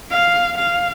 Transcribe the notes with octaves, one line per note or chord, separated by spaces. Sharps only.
F5
F5